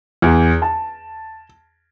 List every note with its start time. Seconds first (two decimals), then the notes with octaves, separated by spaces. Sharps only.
0.22 E2
0.62 A5